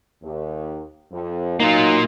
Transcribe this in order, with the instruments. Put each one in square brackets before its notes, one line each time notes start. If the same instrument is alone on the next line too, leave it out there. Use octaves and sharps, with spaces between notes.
[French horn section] D#2
F2
[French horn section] F#3 D#4 [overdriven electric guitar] A#3 F4